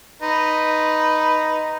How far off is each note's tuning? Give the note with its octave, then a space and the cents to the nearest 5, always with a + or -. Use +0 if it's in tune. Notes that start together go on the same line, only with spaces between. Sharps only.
D#4 +0 B4 +0 C6 +0